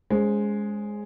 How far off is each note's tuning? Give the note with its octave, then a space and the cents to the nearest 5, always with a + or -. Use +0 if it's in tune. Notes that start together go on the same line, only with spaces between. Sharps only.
G#3 +0 C#4 +40 C5 +10